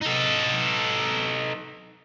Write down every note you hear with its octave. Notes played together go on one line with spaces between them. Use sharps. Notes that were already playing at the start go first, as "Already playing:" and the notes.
D#4 A4